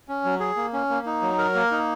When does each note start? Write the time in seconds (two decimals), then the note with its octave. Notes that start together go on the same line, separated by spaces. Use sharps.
0.08 C#4
0.25 F#3
0.40 G#4
0.56 A#3
0.73 C#4
0.90 A#3
1.06 D#4
1.22 F#3
1.38 A#4
1.55 A#3
1.71 D#4